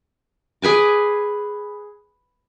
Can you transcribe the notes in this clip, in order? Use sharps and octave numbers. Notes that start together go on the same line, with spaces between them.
G#4 B4 G#5 D6